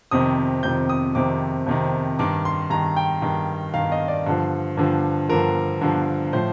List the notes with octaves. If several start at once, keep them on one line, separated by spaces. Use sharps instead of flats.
F2 C3 D#3 D#6
F2 C3 D#3 G6
D#6
F2 C3 D#3 D6
F2 C3 D#3
G2 D#3 D6
C6
G2 D#3 A#5
G5
G2 D#3
G2 D#3 F5
D#5
D5
G2 D3 F3
G2 D3 F3
G2 D3 F3 A#4
G2 D3 F3
A2 F3 C5